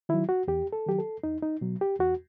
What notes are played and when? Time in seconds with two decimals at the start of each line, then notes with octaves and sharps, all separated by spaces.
0.09 D#3 F#3 E4
0.29 F#4
0.48 E2 G4
0.73 A4
0.86 D#3 F#3 G4
0.98 A4
1.23 E2 D#4
1.42 D#4
1.61 B2 F#3
1.81 G4
1.99 E2 F#4